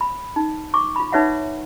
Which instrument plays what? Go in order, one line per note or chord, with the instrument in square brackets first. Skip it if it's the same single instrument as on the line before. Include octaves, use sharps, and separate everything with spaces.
[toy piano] B5
D#4
C#6 D6
F4 B5
D#4 B4 C#5 E5 F#5